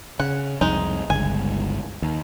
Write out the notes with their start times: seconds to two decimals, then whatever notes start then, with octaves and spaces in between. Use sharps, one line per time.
0.20 C#3 F#5
0.61 C2 F2 G#3 D#4
1.10 G1 C#2 G2 G#5
2.02 D#2